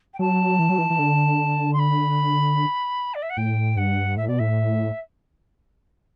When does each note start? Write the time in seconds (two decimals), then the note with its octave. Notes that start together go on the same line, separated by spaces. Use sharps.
0.13 G5
0.19 F#3 A5
0.59 E3
0.69 F#3
0.78 E3
0.90 E3
0.99 D3
1.73 C6
1.78 B5
3.14 D5
3.22 E5
3.29 F#5
3.37 A2 G5
3.76 G2 F#5
4.17 A2 E5
4.27 B2 D5
4.38 A2 E5